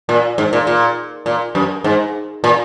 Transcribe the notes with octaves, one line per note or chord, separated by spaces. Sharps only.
A#2
G#2
A#2
A#2
A#2
F#2
G#2
A#2